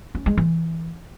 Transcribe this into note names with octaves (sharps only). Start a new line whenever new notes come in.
C#4
G#3
E3